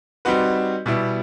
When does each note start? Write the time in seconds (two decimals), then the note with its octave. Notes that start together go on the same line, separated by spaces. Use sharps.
0.25 G3 C4 D#4 F#4 B4
0.86 B2 G3 B3 E4